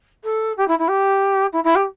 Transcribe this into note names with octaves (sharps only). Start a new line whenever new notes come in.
A4
G4
E4
E4
G4
E4
E4
G4